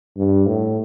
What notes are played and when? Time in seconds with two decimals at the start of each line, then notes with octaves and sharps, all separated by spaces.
0.17 G2
0.47 A2